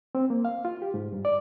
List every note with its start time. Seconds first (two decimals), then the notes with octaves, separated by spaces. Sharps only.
0.15 C4
0.30 A#3
0.45 F5
0.65 F4
0.82 G4
0.94 G#2
1.12 G2
1.25 D5